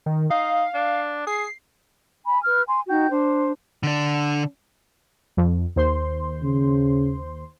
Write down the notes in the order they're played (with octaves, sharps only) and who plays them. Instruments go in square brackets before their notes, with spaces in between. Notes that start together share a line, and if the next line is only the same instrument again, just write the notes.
[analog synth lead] D#3
[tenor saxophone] D#4 [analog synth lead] F5
[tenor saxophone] D4
[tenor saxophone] G#4 [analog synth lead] C7
[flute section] G#5 B5
B4 F6
G#5 C6
D#4 F#4 G5 G6
D4 C5
[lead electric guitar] D3 D4
[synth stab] F2
D#2 C5 C6
[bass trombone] C#3